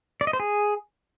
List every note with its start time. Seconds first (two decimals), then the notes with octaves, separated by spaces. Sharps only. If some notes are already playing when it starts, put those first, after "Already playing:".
0.21 D5
0.27 D#5
0.33 C5
0.40 G#4